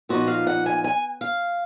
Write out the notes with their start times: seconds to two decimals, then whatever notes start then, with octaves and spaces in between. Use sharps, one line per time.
0.09 A#2 F3 B3 D#4 F#4
0.28 F5
0.47 F#5
0.66 G#5
0.84 G#5
1.21 F5